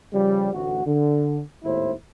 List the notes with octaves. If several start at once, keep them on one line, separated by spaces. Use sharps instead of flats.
C#3 F3 G3
A1 D2 F#4
D3
G#1 D#2 A2 E4 C5